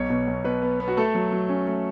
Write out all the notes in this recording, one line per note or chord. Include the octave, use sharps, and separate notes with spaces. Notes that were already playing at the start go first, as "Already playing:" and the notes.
Already playing: B1 C#5
B2
B1
B2 B4
B3
B3
F#4
A3 A4
F#3
F#3
C#4
A3